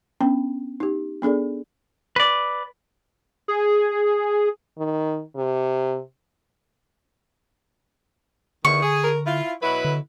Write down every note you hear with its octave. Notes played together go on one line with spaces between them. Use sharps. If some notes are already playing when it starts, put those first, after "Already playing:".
B3 C#4 D4 G5
D#4 G4
B3 D4 G#4 A4 D5
B4 D5
G#4
D#3
C3
E2 D3 D#3 C#6
G#4
A#4
E4 F4
B2 F#3 E4 B4
D3